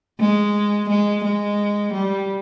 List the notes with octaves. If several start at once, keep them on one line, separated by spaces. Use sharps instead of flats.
G#3
G#3
G#3
G3